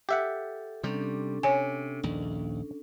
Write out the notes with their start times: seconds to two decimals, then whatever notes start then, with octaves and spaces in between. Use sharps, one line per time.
0.09 G4 A4 E5 F#5
0.84 C3 G3 C#4 D4 A4
1.43 C3 C#5 G#5
2.03 A#1 D#2